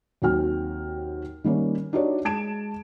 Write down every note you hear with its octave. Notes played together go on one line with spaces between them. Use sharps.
D#2 F#3 C4 F#4 G5 F6
D#3 G3 A#3 C#4
D4 D#4 F#4 G4 C#5 D5
G#3 A5 G#6 D7 E7